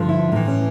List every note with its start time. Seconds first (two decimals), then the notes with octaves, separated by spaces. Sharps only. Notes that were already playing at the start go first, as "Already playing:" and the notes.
Already playing: G2 D3 F3
0.09 E4
0.32 A2 E3 D#4
0.48 C#4